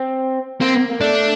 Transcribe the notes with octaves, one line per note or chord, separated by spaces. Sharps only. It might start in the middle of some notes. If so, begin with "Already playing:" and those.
Already playing: C4
A#3 C4
A#3
A3 D4